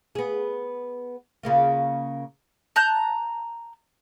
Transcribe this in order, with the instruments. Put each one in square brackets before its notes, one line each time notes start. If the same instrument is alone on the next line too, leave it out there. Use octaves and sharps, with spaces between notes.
[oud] B3 G#4
C#3 A#3 F4
[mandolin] A5 A#5 F#6 G6